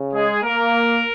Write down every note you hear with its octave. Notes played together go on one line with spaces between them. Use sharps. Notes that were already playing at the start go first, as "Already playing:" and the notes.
Already playing: C#3
G#3 G#4
A#3 A#4